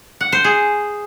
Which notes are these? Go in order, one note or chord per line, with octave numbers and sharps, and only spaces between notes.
F#5
C5
G#4